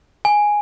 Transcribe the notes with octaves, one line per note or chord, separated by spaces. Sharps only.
G#5